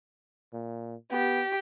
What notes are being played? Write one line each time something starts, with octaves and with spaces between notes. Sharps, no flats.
A#2
B3 G4